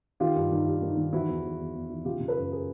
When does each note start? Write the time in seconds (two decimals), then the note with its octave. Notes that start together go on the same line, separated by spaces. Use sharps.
0.20 D#3 F4 G4
0.36 G2
0.51 D#3
0.66 G2
0.82 D#3
0.97 D#3
1.13 E3 E4 F#4
1.28 E2
1.44 E3
1.59 E2
1.74 E2
1.90 E3
2.05 C#3 F4 G4
2.20 C#3
2.28 A4 B4
2.36 F#2
2.52 G#4 A#4